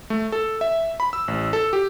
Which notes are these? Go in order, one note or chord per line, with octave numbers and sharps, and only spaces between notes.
A3
A4
E5
B5
E6
A1
A4
G4